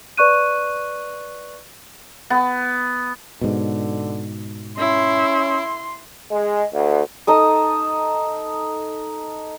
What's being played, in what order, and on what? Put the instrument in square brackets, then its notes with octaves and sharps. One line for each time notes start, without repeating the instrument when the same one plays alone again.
[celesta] B4 D5 C#6 F#6 D#7
[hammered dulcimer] B3
[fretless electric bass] G#2 B2 [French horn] D3
[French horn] C#4 [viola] E4 [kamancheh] C6
[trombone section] G#3
D2
[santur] D#4 A4 D#6